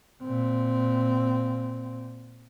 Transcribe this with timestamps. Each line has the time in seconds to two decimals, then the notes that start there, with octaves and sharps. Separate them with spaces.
0.23 A#2 C4